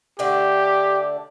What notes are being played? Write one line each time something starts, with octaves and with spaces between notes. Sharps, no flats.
D3 A3 D4 G4